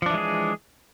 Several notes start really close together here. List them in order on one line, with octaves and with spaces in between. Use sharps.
F3 D4 E3 G#3 G#4